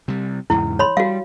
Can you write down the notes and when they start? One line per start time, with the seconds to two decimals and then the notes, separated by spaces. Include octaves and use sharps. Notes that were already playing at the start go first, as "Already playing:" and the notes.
0.08 C3 G3
0.50 E2 G#2 C#3 E4
0.79 C#5 B5 C6
0.97 G3 F#4 F5